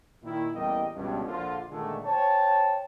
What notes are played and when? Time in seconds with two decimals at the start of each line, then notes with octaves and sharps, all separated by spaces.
0.23 A#2 D#3 E4
0.54 A1 E2 G3 A#3 D#5 G5
0.95 C#2 G2 B2
1.25 A#1 D3 F4
1.70 A#2 D3 D#3 G#3 A3
2.06 C5 C#5 G5 A5